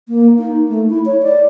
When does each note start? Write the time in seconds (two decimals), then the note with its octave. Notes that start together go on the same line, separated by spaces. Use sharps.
0.08 A#3
0.38 D#4
0.69 A3
0.89 E4
1.06 C#5
1.22 D5